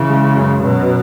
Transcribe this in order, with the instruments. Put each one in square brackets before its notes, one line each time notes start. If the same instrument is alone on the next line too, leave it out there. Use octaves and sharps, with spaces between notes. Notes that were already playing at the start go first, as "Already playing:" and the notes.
Already playing: [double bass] C#3 [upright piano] E3
[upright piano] G#3
F#2
[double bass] B2 [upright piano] F#3